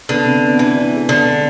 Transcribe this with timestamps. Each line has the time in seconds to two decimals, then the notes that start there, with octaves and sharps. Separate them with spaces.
0.09 D3 B3
0.26 C3
0.42 B3
0.59 E3 D4
0.77 D4
0.93 G#3
1.09 D3 B3
1.25 B3